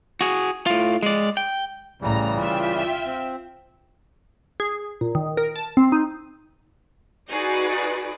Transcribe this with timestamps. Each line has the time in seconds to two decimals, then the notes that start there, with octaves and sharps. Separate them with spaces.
0.21 F#4 G#4
0.66 A2 F4
1.03 G#3 D5
1.37 G5
2.02 A1 C#3 E3 G3 A#5
2.38 F4 E5 G5
3.06 C4
4.60 G#4
5.01 A#2
5.15 D#3
5.37 A#4
5.56 A5
5.77 C4
5.92 D#4
7.29 D#4 F#4 G#4 B4 D5